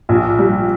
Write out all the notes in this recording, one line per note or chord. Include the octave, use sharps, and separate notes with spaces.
A#1
G3